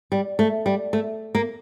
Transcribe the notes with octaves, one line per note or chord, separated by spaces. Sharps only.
G3
A3
G3
A3
A#3